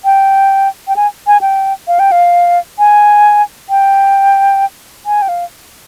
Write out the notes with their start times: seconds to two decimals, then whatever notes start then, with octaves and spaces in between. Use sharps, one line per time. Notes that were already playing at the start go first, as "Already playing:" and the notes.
0.05 G5
0.88 G5
0.96 G#5
1.27 G#5
1.41 G5
1.88 F5
1.99 G5
2.12 F5
2.79 G#5
3.70 G5
5.06 G#5
5.22 G5
5.29 F5